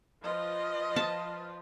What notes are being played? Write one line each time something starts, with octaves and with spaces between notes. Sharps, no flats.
F3 F4 B4 D#5
A5